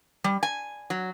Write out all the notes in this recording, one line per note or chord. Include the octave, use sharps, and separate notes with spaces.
G3
G#5
F#3